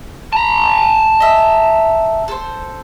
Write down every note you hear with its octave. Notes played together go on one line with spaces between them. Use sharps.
A5 A#5
D#5 E5
A4 C5